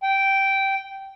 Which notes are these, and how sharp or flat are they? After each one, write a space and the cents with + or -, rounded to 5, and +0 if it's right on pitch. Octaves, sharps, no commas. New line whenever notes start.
G5 -10